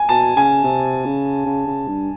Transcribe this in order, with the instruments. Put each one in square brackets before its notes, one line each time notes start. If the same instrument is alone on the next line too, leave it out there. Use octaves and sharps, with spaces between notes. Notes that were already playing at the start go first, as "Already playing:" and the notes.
Already playing: [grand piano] G#5
[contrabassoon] B2 [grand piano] A5
[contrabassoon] C#3 [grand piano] G#5
[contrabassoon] C3
C#3
C#3
C#3
G2